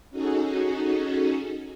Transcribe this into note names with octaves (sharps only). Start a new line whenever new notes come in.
C#4 D#4 F#4 G#4 A4